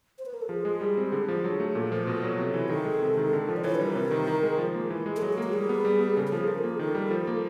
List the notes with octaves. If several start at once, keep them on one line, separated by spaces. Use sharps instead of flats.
C5
B4
A#4
A4
F3 G#4
G#3
G3
C4
D3
F3
F#3
A3
A#2 A4
F3
B2
F#3
C3
E3 A4
D#3 A4
G#3
C3
D#3
D3
F3
D5
E3 C#5
G3 B4
A#4
C3
D#3
D#3
G#3
F3
A#3
E3
G#3
A4
F#3 G#4
F#4
A#3
F#4
G3 G#4
B3
G3
B3
C#3 A4
F3 A4
G#4
F3 A#4
A4
A#3
G#4
D#3 A4
G3
F3
A#3